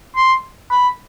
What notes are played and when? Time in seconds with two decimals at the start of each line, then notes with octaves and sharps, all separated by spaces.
0.16 C6
0.71 B5